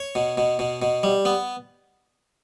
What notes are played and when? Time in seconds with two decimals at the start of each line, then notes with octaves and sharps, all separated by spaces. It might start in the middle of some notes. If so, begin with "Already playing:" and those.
Already playing: C#5
0.15 B2
0.37 B2
0.59 B2
0.82 B2
1.03 G3
1.25 B3